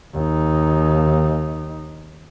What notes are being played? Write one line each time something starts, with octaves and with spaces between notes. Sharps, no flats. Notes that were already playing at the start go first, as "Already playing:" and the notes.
D#2 D#4